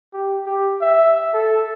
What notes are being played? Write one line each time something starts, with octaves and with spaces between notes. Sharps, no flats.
G4
G4
E5
A4